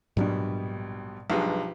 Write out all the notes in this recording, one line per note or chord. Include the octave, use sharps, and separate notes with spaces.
A#1 G#2 B2 F#3 G3 D4
B1 G2 F3 G#3 G4 B4